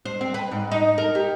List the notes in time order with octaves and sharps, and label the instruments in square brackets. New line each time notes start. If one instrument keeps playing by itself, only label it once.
[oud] C5
C4
B4
G#2
D#4
A#4
G4